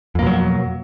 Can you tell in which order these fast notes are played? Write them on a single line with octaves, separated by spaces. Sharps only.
F2 A#3 B2 F#3